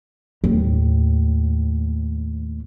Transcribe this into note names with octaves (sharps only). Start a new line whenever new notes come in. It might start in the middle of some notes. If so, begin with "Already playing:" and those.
D#2 A2